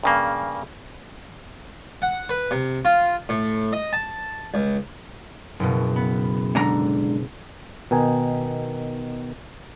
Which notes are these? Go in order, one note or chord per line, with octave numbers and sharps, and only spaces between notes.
G2 C#3 A#3
F#5
B4
C3
F4
A2
D#5
A5
C#2
F#1 B2
B3
G#2 D3 A#5
B2 D#3 D#4 G#5